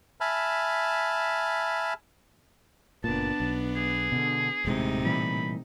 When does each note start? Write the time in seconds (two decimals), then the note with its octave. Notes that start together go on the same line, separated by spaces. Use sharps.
0.21 E5 G#5 A5 B5 F6
3.04 F#1 A#2 B3 D4 A5
3.40 B1
3.76 G#4
4.12 B2 D3
4.65 D#1 A2 C3 G#3 D#4
5.05 A#2 E3 G3 B5